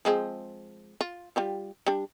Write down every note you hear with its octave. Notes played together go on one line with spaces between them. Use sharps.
F3 G#3 C4
F4
G3 F4 G4
G3 D4